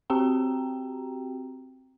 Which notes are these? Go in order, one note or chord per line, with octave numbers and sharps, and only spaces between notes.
C4 F#4 G4 G5 A#5